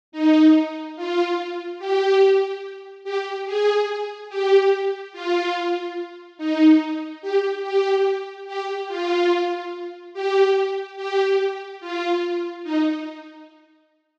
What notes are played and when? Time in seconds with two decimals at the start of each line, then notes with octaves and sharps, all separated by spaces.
0.12 D#4
0.96 F4
1.79 G4
3.04 G4
3.46 G#4
4.29 G4
5.13 F4
6.38 D#4
7.22 G4
7.63 G4
8.47 G4
8.88 F4
10.14 G4
10.97 G4
11.81 F4
12.64 D#4